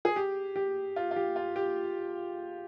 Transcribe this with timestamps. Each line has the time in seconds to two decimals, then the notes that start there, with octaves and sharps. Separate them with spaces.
0.05 G#4
0.16 G4
0.56 G4
0.96 F4
1.11 F4
1.16 G4
1.36 F4
1.56 G4